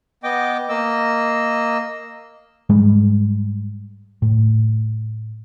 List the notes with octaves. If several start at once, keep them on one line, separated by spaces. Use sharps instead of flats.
B3 D#5 G5 D6
A#3 D#5 E6
G#2 G3 G#3
A2